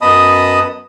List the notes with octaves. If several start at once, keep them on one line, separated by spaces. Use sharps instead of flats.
F#2 B3 D#5 A5 B5 D#6